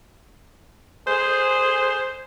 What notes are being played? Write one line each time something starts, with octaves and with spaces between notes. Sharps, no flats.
G#4 C5